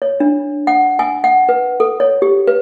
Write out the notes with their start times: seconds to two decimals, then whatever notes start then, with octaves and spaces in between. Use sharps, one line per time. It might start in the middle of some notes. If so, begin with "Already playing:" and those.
0.02 C#5
0.20 D4
0.67 F#5
0.99 G#5
1.24 F#5
1.49 B4
1.80 A4
2.00 C#5
2.22 G4
2.48 B4